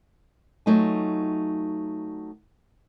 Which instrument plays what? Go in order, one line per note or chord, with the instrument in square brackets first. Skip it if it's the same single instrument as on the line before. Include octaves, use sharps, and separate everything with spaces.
[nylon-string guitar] F#3 A3 D#4 F4 G#5